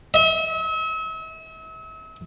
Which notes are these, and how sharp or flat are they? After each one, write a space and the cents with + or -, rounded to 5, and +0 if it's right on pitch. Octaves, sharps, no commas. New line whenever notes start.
E5 -40